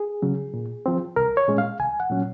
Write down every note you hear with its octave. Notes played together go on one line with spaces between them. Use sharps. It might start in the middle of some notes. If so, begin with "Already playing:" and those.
Already playing: G#4
C#3 F#3 C#4
A#2
F3 C4
C2 A#4
C#5
A#2 G#3 C#4
F5
C2 G#5
F#5
A#2 F#3 C#4